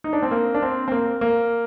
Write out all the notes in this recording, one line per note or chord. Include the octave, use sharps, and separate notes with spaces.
D#4
D4
C4
A#3
D4
C4
C4
A#3
A#3